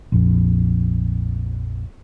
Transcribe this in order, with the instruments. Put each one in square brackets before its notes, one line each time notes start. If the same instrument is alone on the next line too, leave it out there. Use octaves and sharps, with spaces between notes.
[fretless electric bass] A#1 F2